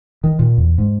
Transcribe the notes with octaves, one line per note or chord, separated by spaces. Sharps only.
D#3
A#2
E2
G#2